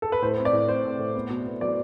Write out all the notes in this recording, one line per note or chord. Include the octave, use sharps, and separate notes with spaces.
A4
B4
A2 C5
C4
D5
A2
C4 C5
C4
A2
B3
B2
B3
F#3 D5